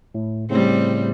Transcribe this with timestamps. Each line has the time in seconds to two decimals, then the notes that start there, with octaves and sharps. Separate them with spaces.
0.15 A2
0.50 A2 C#3 G3 C4